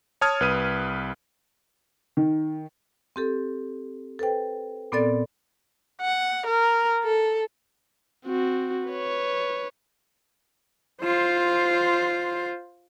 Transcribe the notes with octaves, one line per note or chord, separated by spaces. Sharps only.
C#5 A5 D#6 F6 G#6
C2 B4 D#6 D#7
D#3
C4 G4 A4
A4 B4 C5 G5
A#2 B3 C4 A4 D5 A6
F#5
A#4
A4
C4 F#4
B4 C#5
F4 C5